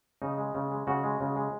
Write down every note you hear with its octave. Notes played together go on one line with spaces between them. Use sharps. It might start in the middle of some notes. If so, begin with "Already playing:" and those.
C#3 D#4
G#3
C#3
G#3
C#3 F#4
G#3
C#3
G#3